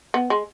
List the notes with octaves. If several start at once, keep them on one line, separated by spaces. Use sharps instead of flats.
B3
G#3